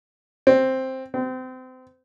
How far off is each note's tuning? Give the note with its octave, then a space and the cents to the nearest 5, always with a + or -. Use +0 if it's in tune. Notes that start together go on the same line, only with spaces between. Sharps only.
C4 +5
C4 -30